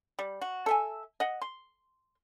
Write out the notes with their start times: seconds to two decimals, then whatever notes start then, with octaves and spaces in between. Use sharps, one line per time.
0.19 G3
0.41 F#4
0.66 A4 E5 G#5
1.20 D#5 F#5
1.42 C6